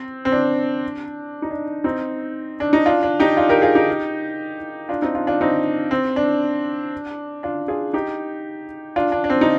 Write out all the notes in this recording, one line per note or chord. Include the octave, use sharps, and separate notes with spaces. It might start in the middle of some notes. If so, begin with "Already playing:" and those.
Already playing: C4
C4
D4
D#4
D4
C4 D#4
D4
D#4
D4 F4
D4
D#4 G4
D4 F4
G4 A#4
F4 G#4
D#4 G4
D4 F4
C4 D#4
D4 F4
D4 F4
C4 D#4
C4
D4
D4 F4
F4 G#4
D#4 G4
D4 F4
D4
D4
C4
D#4